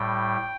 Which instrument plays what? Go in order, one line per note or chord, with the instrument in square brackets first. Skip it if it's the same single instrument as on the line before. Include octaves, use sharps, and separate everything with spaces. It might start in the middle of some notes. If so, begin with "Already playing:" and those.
Already playing: [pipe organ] A2 G3 G5